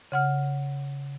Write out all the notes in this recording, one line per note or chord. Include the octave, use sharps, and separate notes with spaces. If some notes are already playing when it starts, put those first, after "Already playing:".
C#3 F#5 F6